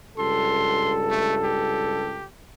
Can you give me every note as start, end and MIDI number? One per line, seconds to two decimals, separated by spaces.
0.18 2.27 37
0.18 2.27 43
0.18 2.27 69
0.18 0.95 84
1.11 1.35 57
1.43 2.25 67